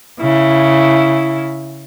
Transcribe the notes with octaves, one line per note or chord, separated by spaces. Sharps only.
C#3 E4